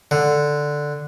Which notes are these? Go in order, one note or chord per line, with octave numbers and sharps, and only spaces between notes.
D3